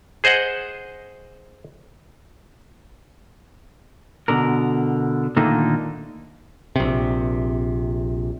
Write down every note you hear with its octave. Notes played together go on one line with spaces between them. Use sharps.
G#4 C5 D#5 F#5
B2 D3 A#4
A#2 D3 D#3 A3 A#3 D#4
A#1 C3